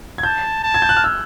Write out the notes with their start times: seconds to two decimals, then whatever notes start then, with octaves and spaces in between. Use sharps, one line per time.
0.18 G#6
0.23 A5 G6
0.63 A5
0.74 G#6
0.82 G6
0.89 F#6
0.97 F6
1.04 E6